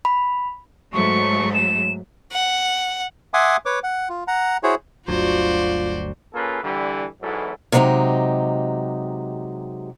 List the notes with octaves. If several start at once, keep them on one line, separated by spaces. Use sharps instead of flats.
B5
G#2 F#3 A3 C#6
E7
F#5
E5 F#5 G#5 C6 D6 D#6
B4 C#5 D6
F#5
F4
F#5 A#5
E4 F#4 G#4 C5 C#5
G1 D2 F#3 F4 F#4 C5 D5
A#3 C#4 F4 G#4 A4 B4
D3 E3 G3
B1 E2 G#2 E3 F#3 A4
C3 F#3 G#3 B3 D#4 G4